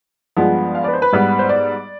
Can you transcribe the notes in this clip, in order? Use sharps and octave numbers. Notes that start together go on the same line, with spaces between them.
G2 F3 G#3 B3
F5
D5
B4
C5
B4
G#2 G3 B3
C5
D5